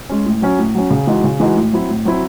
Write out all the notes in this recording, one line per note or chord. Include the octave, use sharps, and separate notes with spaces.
G#3 C#4
A2
F#3 C#4
A2
F#3 C#4
C#3
E3 G#3 D#4 F#4
C#3
E3 G#3 D#4 F#4
A2
F#3 C4 E4
A2
F#3 C4 E4